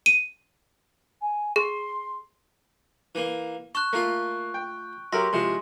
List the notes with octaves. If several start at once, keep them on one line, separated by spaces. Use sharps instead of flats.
D#7
G#5
G#4 C6
E3 A#3
A5 C#6 F#6
A3 A#3 F4
G5
F#3 G4 A#4 E5 C6 A#6
C3 F3 G#3 E4